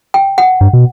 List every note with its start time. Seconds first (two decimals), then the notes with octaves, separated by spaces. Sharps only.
0.14 G5
0.38 F#5
0.61 G2
0.73 B2